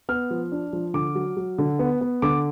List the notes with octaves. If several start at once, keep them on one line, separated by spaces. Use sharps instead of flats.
B3 F6
F3
D4
F3
D3 D6
F#3
F#3
D3
B3
B3
D3 D6